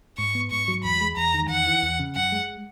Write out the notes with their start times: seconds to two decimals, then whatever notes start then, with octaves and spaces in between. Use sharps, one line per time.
0.18 G#2 C#6
0.35 B3
0.51 G#2 C#6
0.68 F#3
0.84 E2 B5
1.01 G#3
1.17 E2 A#5
1.34 D#3
1.50 E2 F#5
1.66 E3
1.83 E2
1.99 C#3
2.15 F#2 F#5
2.32 G#3